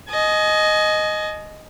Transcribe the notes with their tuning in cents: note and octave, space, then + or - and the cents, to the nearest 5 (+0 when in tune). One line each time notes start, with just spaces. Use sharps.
D#5 +0 G#5 +35